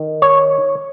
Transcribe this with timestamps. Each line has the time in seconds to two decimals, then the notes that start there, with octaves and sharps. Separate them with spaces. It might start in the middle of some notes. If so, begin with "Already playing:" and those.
Already playing: D#3
0.22 C#5